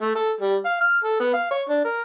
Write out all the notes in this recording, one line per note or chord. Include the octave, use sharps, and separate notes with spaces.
A3
A4
G3
F5
F6
A4
B3
F5
C#5
D4
A#4